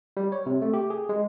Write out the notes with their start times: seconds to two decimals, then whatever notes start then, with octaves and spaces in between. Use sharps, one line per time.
0.17 G3
0.32 C#5
0.46 C3
0.62 A3
0.74 G4
0.90 G#4
1.09 G#3